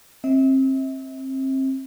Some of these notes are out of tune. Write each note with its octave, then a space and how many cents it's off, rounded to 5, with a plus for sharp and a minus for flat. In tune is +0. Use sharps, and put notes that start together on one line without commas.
C4 +30 E5 -35